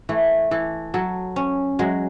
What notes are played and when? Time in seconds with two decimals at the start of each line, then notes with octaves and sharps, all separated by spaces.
0.09 E3 A3
0.51 E3 A4
0.94 F#3 A4
1.36 C#4
1.79 F#3 G#3